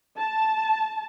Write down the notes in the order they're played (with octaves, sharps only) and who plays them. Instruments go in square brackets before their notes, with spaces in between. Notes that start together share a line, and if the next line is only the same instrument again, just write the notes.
[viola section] A5